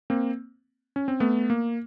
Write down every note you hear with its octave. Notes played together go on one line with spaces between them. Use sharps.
A#3 C4
C#4
C4
A3 B3
A#3